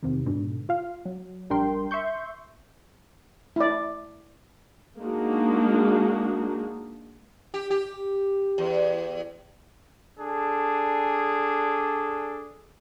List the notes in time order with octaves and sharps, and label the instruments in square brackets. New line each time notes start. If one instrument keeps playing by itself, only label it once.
[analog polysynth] E2 C3 D#3
G#2 B2 D3
F4 F5
F#3
A#1 G3 D4 A#4 G5 C6
E5 C6 C#6 G6
[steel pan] E4 D5
[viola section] G#3 A#3 D4 D#4 F#4
[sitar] G4
G4
E2
[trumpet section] D4 G#4 A4